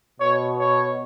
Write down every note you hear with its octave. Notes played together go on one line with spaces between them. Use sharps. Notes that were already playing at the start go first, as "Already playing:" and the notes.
B2 C#5
C#5